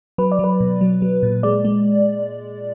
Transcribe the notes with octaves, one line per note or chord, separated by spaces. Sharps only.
F#3 B4
D5
F#3 B4
B2
F#3
F#3
A#2
G#3 D5
G#3